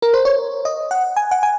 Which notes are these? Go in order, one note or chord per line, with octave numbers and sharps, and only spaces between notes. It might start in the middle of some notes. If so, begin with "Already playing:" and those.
A#4
C5
C#5
D#5
F#5
G#5
F#5
G#5